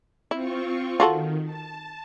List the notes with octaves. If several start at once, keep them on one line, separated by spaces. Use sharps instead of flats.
C4 E4 F4 C#6
D#3 F4 F#4 A4
A5